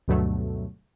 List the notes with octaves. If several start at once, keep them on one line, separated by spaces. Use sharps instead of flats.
D2 G2 B2 F#3 A3